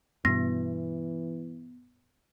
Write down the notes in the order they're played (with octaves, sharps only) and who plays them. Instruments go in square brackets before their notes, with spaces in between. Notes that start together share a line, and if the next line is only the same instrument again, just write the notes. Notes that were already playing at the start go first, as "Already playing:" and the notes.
[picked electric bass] G2 B2 [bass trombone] E3 [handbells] B3 [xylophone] A#6